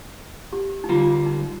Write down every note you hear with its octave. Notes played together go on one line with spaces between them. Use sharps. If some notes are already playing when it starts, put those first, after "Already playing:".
G4
D#4
D3 G3 A#3 F4
F4
F4
D#4